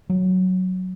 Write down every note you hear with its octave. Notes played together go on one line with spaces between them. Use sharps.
F#3